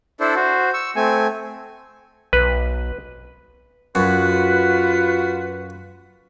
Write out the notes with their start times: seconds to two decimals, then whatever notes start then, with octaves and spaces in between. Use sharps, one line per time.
0.20 D4 E4 A4 C5
0.35 F#4 C5
0.74 C#6 E6
0.96 A3 C4 G#5
2.33 B1 B4
3.95 F#2 F4 F#4 B4